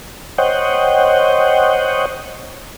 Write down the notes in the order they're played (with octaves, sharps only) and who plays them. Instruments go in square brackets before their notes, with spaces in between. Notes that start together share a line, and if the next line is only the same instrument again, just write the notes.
[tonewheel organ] C5 C#5 D#5 F#5 G5